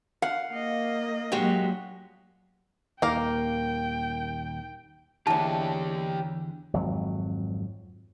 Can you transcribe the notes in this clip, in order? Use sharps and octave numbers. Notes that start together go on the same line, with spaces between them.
F5 F#5
A#3 D#5
A#2 F#3 G#3 F#4 G4 F#5
D#1 D#2 A#3 A#4 G5
E2 D3 E3 D4 G4 C#5 A5
G#1 F2 F#3